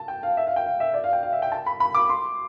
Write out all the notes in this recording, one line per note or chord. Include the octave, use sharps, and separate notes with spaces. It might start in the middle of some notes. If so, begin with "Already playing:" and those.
Already playing: A5
G5
F5
E5
F5
G5
F5
E5
D5
F5
G5
F5
E5
G5
A5
B5
B5
D6
C6